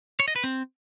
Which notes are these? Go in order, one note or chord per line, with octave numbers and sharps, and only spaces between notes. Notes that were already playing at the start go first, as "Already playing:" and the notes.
C#5
D#5
B4
C4